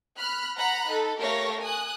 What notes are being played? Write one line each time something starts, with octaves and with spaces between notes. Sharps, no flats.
B5 F6 F#6
F#5 A#5 B5 F#6
D#4 A4
A3 G4 A#4 C#5 F5 A#6
G#5 D#6 F#6